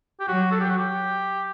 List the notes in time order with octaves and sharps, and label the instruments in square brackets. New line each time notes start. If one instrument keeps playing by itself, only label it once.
[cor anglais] G4
[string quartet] F#3 [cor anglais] F#4
[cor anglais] A4
G4
F#4
G4